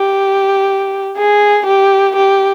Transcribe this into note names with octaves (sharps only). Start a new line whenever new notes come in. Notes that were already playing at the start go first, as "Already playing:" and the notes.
Already playing: G4
G#4
G4
G4